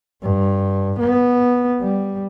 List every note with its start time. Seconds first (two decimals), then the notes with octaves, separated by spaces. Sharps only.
0.22 G2
0.99 B3
1.80 G3